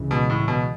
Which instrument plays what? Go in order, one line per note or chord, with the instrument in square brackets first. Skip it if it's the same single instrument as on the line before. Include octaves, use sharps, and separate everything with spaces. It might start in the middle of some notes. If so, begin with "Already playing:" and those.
Already playing: [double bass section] C#2 C#3 E3
[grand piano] B2
A2
B2